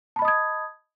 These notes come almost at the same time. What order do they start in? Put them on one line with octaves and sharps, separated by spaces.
A5 B5 D#5 D#6 G#6